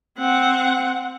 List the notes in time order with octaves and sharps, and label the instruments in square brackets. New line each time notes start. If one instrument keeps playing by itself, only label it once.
[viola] C4 F#5